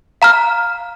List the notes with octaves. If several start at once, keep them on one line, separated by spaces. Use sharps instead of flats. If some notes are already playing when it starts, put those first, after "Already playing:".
F5 A#5 F6